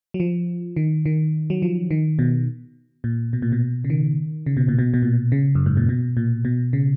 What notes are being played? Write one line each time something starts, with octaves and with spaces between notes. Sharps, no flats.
F#3
F3
D#3
D#3
F#3
F3
D#3
B2
A#2
B2
A#2
B2
C#3
D#3
C#3
B2
A#2
B2
B2
A#2
C#3
F#2
G#2
A#2
B2
A#2
B2
C#3